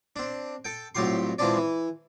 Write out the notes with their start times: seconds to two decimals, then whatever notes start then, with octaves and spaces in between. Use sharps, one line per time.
0.16 C4 D4
0.65 A4 G5
0.95 C2 A2 F#3 F4 G4 C6
1.38 E3 F3 G#3 C4 D4 D5
1.57 E3